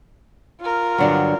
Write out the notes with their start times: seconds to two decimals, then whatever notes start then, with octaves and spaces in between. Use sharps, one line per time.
0.61 F4 A#4
0.98 G2 D3 F#3